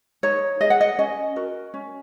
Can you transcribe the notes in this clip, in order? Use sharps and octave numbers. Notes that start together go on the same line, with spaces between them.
D#4 C#5
G#4 D#5
F#5
D#5
C#4 D#5
F#4 A#4
C#4